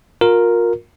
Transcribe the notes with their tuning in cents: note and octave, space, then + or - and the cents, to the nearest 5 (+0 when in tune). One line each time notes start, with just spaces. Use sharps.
F4 +35 A#4 +0